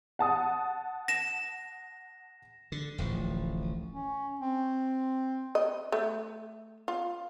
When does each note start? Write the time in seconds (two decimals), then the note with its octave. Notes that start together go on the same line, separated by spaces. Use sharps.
0.19 F#5 A5 D#6
1.08 A#6 E7
2.72 D3
2.98 D1 A1 F3
3.91 C#4
4.41 C4
5.55 D#5
5.92 A3
6.88 F4